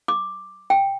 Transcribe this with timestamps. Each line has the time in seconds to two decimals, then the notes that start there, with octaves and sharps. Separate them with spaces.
0.08 D6
0.70 G5